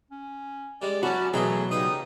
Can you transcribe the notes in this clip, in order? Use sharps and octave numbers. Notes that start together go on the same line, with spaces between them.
C#4
G3 G#3 D5
F#2 F#3 C#4 F#4 D5 A5 B5
B2 E3 F#3 A3 G#4 G5 A#5 B5
C#3 G3 D#4 B4 D#6